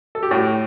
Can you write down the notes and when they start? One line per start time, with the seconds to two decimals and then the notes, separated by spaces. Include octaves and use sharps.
0.15 A4
0.23 G4
0.31 A2 F#4